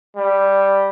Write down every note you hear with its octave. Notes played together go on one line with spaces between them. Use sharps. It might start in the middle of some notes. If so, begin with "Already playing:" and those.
G3